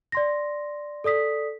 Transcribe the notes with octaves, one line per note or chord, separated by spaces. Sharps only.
D5 C6 A#6
A4 D5 D#6 B6